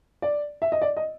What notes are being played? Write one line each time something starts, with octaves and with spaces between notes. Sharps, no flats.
D5
E5
D#5
D5
D#5